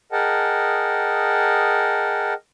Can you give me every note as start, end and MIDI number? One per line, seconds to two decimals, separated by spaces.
0.12 2.34 68
0.12 2.34 70
0.12 2.34 75
0.12 2.34 78
0.12 2.34 79
0.12 2.34 81